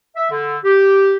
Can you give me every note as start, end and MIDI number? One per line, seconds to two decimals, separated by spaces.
0.17 0.31 76
0.31 0.58 50
0.65 1.17 67